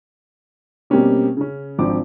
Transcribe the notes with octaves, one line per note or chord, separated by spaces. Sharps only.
B2 G3 A#3 C4 C#4 G4
C#3 C#4
G#1 F3 C4 D4 D6